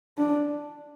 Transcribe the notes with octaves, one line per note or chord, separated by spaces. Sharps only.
D4